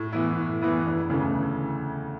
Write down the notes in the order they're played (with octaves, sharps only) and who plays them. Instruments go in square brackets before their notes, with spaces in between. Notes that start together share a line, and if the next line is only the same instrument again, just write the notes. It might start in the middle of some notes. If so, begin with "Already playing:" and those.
Already playing: [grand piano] A2
E3 B3 E4
A2
E3 B3 E4
E1
D2 C#3 E3 A3